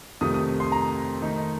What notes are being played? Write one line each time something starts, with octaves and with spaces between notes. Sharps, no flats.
F2 C3 D#3 A3 D#6
D#6
C6
A#5
D#3 A3 D#4